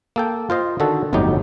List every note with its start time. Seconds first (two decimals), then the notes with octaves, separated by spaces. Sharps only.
0.16 A#3 A4 G5
0.50 F4 C5 D#5 F5
0.80 D3 D#3 F#4 A4
1.13 G1 F2 A2 F#3 D#4 G4